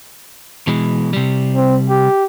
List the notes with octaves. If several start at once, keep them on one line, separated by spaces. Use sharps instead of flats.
B2 E3 G#3
C3 G3
C4
G4